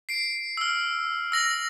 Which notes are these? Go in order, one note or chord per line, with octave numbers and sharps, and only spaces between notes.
C7 D7
E6 F6
E6 A#6 F#7